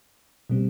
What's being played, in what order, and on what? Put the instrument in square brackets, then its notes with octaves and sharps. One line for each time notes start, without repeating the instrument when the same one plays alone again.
[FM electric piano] B2 G3 C4